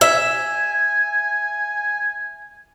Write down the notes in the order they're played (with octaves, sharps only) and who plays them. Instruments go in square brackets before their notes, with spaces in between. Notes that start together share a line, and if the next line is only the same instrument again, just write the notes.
[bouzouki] E5 [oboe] G#5